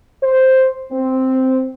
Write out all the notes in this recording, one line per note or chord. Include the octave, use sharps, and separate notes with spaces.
C5
C4